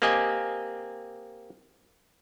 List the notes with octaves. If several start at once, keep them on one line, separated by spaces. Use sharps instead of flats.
A#3 C4 G4 D#5 G#5